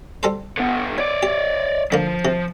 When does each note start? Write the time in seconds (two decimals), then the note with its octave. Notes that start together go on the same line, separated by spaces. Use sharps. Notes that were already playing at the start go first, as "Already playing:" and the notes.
0.23 G3 A4 C5
0.58 D3 B3
0.97 C#5 D5
1.23 G4
1.92 D3 F3 A#3
2.25 C3